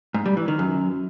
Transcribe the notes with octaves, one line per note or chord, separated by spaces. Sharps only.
G#2
G3
E3
D#3
F#2